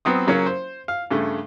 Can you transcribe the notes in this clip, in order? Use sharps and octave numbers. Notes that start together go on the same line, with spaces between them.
F#3 B3 C4 D#6
C#3 F#3 A#3 C#4
C5
F5
G2 C#3 A3